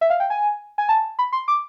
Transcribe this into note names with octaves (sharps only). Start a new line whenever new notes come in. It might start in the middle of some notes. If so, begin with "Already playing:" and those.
E5
F5
G5
G#5
G#5
A5
B5
C6
D6